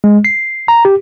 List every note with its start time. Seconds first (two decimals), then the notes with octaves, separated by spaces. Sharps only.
0.04 G#3
0.24 C7
0.68 A#5
0.85 G4